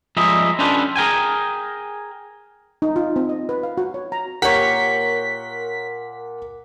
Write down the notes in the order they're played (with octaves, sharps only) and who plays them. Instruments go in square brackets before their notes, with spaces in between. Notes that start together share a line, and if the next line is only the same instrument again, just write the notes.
[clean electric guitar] F3 G3 G#3 A#3 D#5 E5
C#4 D4 F4 G4 A4 B4
G#4 A#4 G5 G#5
[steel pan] D#4
F4
C4
D#5
B4
F5
F#4
C#5
A#5
[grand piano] A#2 F#5 [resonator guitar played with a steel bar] G4 C#5 [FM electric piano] A#4 [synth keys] B6